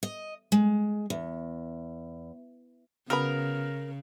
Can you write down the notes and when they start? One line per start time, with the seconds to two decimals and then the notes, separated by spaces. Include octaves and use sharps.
0.03 D#5
0.52 G#3
1.10 E2
3.10 C#3 F#3 B3 A#4 B5